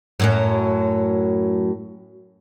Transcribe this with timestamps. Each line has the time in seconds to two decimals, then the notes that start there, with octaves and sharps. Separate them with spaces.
0.20 F#2 A2 F#3